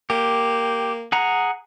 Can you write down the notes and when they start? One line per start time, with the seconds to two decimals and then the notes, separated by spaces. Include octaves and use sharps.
0.10 A#3 G4
1.12 G#4 F#5 A#5